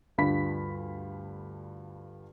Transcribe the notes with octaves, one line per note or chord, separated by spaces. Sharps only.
D2 G2 F4 G4 B5 B6